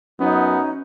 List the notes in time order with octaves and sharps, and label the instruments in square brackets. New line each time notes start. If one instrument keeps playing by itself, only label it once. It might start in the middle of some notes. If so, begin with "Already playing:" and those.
[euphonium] F#2 [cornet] B3 [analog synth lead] C#4 [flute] D#4